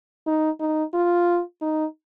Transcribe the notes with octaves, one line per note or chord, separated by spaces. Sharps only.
D#4
D#4
F4
D#4